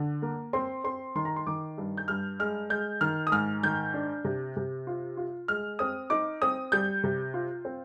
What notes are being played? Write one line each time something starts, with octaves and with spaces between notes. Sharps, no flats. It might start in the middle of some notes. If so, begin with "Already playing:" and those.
Already playing: D3
A#3
C4 C6
C4 C6
D#3 C6
A#5
C6
D#3 D6
G2
G6
G2 F6
G#3 F6
G#3 G6
D#3 F6
D#6
G#2 F6
D#3 G6
D4
C3
C3
F4
F4
G#3 F6
C4 D#6
D#4 D6
C4 D#6
G3 G6
C3
F4
C4